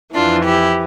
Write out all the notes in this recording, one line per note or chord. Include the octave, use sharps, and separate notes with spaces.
F2 E3 D4 F4
E4 G4